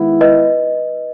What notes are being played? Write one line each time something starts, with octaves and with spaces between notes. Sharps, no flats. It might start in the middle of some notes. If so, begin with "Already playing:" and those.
Already playing: D#3 G#3 B3 E4
B4 D#5